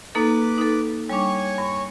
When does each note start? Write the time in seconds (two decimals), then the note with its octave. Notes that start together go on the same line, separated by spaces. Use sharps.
0.15 A#3 D#4 A4 B4 D6
0.58 D#4 A4
1.10 G3 D4 C#5 G#5 C#6
1.58 G2